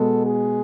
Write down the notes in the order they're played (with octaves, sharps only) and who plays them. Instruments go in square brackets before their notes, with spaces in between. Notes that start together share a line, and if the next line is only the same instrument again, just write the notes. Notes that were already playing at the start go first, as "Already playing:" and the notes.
Already playing: [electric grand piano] B2 G#3 B3 [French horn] A4
[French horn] G#4